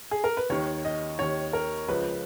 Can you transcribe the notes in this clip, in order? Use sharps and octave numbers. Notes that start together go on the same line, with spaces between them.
G#4
A#4
B4
D#2 D#3 C#5
D#5
D#2 D#3 C#5
A#4
C#2 C#3 F3 B4